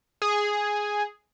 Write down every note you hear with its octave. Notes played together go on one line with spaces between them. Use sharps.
G#4